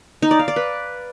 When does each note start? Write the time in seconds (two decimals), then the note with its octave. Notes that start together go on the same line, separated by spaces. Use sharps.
0.22 D#4
0.31 D5
0.39 F5
0.48 D5
0.56 B4